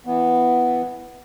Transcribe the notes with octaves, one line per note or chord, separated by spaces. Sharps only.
E3 B3